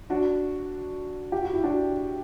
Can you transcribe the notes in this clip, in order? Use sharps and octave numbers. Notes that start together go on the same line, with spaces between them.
D4 F#4
G4
F#4
E4
D4 F#4